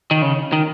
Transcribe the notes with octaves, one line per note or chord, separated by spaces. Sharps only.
D#3
C#3
D#3